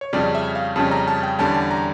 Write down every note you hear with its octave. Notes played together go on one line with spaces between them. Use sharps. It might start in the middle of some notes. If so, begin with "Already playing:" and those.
C#5
F2 C#3 G3 C#4 D5
E5
F5
F2 C#3 G3 C#4 A5
A#5
A5
G5
E2 D3 G3 C#4 A5
A5
A#5